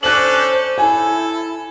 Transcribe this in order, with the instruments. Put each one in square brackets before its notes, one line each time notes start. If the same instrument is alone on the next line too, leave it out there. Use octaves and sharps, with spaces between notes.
[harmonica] C#4 D4 A4 [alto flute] C5 [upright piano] F#6 F#7
[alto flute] E4 [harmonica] A4 [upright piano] G#5